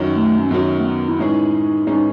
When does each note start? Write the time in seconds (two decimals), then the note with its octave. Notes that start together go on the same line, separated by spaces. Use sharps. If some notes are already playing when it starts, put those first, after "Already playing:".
Already playing: F#2 D#3 F#3
0.16 A3
0.39 C#4
0.51 F#2 D#3 F#3 B3
0.79 A3
0.85 B3
1.08 E4
1.18 A2 E3 G#3 C#4 D#4 G#4
1.87 A2 E3 G#3 C#4 D#4 G#4